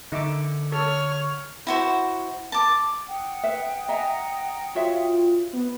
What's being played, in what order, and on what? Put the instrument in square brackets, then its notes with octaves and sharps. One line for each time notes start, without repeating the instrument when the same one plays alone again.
[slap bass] D3 [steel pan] D#4 E5 D6
[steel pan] A4 [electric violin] C#5 F6
[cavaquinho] E4 F#4 C5
A5 D6
[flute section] F#5 G5 D#6
[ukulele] B4 E5
[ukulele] D#5 E5 G#5 [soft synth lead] A#5
[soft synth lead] F4 [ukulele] F#4 C#5 E5
[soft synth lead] B3